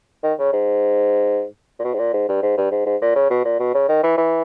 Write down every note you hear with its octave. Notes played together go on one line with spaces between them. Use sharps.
D#3
C#3
G#2
A#2
B2
G#2
A#2
G#2
G2
G#2
G2
G#2
G#2
A#2
C#3
B2
A#2
B2
C#3
D#3
E3
E3